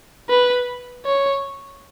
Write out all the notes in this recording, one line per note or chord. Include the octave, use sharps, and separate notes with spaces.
B4
C#5